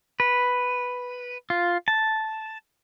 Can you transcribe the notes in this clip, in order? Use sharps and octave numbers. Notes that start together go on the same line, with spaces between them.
B4
F4
A5